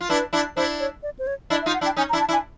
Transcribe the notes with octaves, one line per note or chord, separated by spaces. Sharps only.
F4
D4 E4 B4
D4 E4
D4 E4 C5
C#5
D5
C5
C#5
D4 E4 D#5
E5
D#4 F4
F#5
D4 E4
G5
C#4 D#4 G#5
A#5
D4 E4
A5
D4 E4
G#5